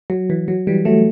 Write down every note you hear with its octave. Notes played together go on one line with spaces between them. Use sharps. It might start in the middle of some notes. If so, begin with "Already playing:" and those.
F#3
E3
F#3
E3 G3
F#3 A3